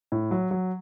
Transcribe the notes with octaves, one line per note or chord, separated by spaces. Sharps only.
A2
F#3
F#3